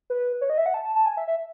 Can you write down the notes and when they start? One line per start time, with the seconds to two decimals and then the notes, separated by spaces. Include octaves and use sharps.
0.10 B4
0.41 C#5
0.50 D#5
0.58 E5
0.66 F#5
0.74 A5
0.85 A5
0.96 A5
1.06 G#5
1.17 E5
1.28 E5